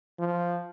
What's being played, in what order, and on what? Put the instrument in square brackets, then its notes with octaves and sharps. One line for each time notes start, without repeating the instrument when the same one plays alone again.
[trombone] F3